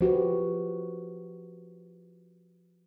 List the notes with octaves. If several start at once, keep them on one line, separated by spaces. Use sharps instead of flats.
F3 F#4 G4 B4